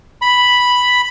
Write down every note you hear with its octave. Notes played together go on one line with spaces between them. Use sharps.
B5